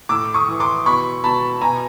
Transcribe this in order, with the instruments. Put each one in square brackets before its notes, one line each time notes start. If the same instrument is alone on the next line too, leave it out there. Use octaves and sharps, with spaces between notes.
[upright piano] A2 D6 E6
C#6 D#6
E3
C6 D6
B2 B5 C#6
B2 A5 B5
B2 G#5 A#5